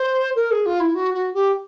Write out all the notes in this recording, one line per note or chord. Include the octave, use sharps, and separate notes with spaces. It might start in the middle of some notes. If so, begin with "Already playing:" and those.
Already playing: C5
A#4
G#4
F4
E4
F#4
F#4
G4